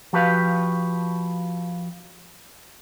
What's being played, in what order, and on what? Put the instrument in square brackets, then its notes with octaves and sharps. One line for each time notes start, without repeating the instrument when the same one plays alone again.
[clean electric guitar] F3 F#4 G4 B4 F5